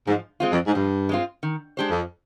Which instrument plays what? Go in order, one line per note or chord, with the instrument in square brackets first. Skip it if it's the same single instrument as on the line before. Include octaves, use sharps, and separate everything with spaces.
[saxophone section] G#2 [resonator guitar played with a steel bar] F3
[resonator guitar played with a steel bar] G#3 C4 F4
[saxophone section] F2
G#2
[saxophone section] G2 [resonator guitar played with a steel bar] F3
[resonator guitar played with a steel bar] G#3 C4 F4
D#3
G#3 D4 G4 C5
[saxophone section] F2